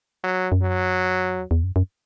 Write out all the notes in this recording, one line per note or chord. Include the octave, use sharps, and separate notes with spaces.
F#3
F#2
F#3
E2
E2
F#2
F#2